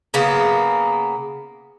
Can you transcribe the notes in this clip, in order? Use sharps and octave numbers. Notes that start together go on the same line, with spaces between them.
C#3 A#3 B3